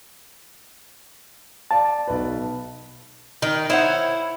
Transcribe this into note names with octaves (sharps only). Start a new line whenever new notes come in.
D5 F5 A5
B1 B4
D#3
E4 C5 C#5 F#5